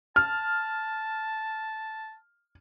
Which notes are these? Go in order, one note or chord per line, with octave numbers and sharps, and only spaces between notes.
A5 F6